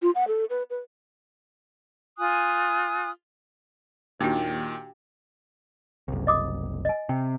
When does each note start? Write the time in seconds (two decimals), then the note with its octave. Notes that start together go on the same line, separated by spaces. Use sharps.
0.02 F4
0.15 F#5
0.28 A4
0.50 B4
0.70 B4
2.18 F4 G#5 D#6 F#6
4.21 D#2 A#2 D#3 D4 F#4 G4
6.08 F#1 C2
6.27 D#5 D6 D#6
6.85 D#5 G#5
7.09 C3 G5